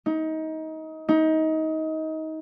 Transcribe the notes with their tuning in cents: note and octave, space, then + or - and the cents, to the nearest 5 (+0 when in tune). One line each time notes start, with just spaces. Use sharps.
D#4 +25
D#4 +25